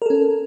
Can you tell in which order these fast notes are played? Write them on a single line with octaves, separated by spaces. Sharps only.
A#4 A4 C#4